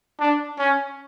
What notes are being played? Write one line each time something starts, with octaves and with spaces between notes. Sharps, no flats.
D4
C#4